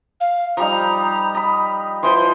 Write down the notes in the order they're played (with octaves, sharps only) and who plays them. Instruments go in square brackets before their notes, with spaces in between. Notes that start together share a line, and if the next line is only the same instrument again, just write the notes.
[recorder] F5
[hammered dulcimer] F3 G3 D#4 [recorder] A#5
[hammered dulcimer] D#5 B5
[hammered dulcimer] E3 F3 C5 [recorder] C6